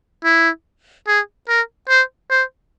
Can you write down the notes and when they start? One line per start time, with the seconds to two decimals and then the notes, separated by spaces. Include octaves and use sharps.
0.24 E4
1.07 G#4
1.49 A#4
1.89 C5
2.30 C5